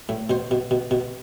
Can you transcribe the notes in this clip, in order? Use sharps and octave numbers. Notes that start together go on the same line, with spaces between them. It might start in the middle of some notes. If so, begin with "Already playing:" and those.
A2
B2 C5
B2
B2
B2